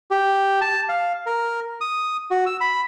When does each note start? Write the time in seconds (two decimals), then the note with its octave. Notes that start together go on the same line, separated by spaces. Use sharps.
0.11 G4
0.61 A5
0.89 F5
1.26 A#4
1.81 D#6
2.31 F#4
2.46 E6
2.61 B5